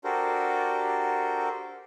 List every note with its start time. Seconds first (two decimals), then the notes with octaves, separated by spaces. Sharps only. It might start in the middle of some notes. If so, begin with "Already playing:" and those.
0.04 D4 F#4 G4 A4 A#4 C5